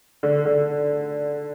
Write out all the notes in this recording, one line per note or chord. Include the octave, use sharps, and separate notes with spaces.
D3
D3